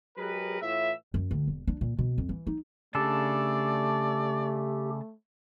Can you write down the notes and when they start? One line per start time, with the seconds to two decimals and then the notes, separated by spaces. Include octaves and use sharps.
0.18 F#3 G#3 G4 G#4 A#4 B4
0.62 A2 E3 F4 E5
1.14 F#2
1.31 D2
1.48 E1
1.67 D4
1.81 A#2
1.99 B2
2.18 F2
2.29 E3
2.47 D#4
2.95 C#3 A3 D4 G4 A4 D5